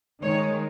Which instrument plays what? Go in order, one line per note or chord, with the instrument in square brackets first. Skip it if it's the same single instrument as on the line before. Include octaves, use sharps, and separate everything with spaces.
[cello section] D#3 G#3 C#5